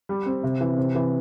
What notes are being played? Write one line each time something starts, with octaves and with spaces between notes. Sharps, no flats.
G3
C4
C3
E3
C3
E3